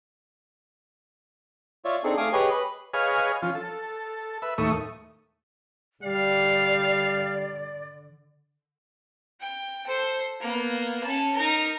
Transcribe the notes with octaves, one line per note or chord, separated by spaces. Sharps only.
F4 C#5 D5 E5
C4 D4 D#4 G#4 A4
A3 F5 G#5 D6 D#6
G4 G#4 B4 C#5 D#5 G#5
B4 B5
G#4 B4 C#5 D#5 F5 G#5
F3 C#4 F4
A4
B4 E5
D#2 A2 A3 E5 C#6 D#6
D3 G3 D5 F5
G5
A4 C5
A#3 B3
C#4 A5
D#4 A#4